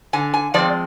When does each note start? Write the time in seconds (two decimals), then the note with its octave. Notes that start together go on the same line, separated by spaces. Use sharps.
0.13 D3 G#5
0.34 G#5
0.54 F3 G#3 C4 D5